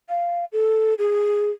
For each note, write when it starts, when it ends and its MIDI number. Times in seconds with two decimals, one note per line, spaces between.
0.09 0.45 77
0.52 0.94 69
0.98 1.50 68